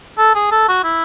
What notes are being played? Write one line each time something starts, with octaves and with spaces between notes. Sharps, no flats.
A4
G#4
A4
F#4
E4